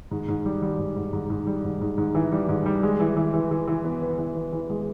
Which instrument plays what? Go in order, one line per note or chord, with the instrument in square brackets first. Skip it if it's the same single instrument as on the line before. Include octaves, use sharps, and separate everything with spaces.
[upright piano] G#2
G#2
G3
G3
G#2
G#2
G#2
G#2
G3
G#2
G#2
G#2
E3
G3
G#2
G3
G#3
E3
E3
E3
E3
E3
B3
B3
E3
B3
E3
G#3